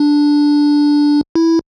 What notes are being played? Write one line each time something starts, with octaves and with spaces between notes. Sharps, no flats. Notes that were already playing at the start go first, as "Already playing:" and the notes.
Already playing: D4
E4